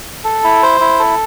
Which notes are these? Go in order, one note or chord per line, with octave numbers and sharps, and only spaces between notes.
A4
E4
C5
E4
A4